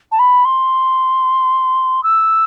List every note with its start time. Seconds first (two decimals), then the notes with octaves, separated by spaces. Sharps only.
0.12 A5
0.19 B5
0.45 C6
2.03 E6